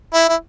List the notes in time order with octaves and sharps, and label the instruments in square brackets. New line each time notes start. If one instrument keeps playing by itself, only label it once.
[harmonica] E4
E4